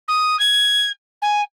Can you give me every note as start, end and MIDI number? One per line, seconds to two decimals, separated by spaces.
0.08 0.38 87
0.39 0.89 92
1.22 1.41 80